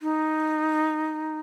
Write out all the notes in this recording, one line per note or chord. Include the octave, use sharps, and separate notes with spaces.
D#4